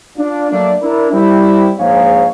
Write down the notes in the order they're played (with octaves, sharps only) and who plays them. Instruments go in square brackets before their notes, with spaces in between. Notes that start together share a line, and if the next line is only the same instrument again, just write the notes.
[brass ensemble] D4 F4
F#3 A3 A#3 D4 D5
D4 E4 A#4
G3 C4 E4
A#1 G#2 G#4 C#5 F5